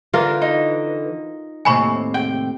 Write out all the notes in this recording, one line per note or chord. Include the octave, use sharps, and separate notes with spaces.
D3 E3 F4 A#4
D#4
D#2 A2 C3 G#5 B5 C#6
G5